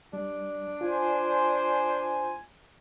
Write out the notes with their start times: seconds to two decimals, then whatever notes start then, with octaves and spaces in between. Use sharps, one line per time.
0.13 G3 D4
0.81 F4 C5 G#5